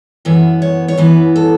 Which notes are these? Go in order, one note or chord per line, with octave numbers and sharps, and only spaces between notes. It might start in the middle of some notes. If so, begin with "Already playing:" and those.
F#2 E3 B3 E5
C#5
C#5
F#2 E3 B3 B4
A4